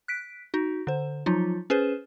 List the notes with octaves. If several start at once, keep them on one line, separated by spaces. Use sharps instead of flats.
F#6 B6 D7
D#4 F#4
D3 C5
F3 F#3 D#4 F4
C#4 G#4 B4 C5